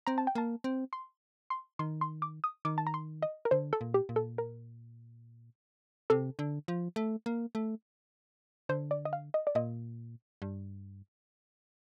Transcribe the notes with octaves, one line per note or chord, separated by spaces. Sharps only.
C4 A#5
A5
G5
A#3 A5
C4
C6
C6
D#3 C6
C6
D6
D#6
D#3 D6
A5
A#5
C6
D#5
A#4
D3 C5
A4
A#2
G4
A#2
A4
A#4
C3 A4
D3
F3
A3
A#3
A3
D3 C5
D5
D#5
F5
D#5
D5
A#2 D#5
G2